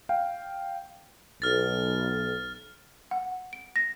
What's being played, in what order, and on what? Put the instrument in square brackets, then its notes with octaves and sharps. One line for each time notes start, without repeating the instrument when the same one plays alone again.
[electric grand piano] F5 G5
[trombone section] B1 [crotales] F6 A6
[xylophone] F#5
D7
A#6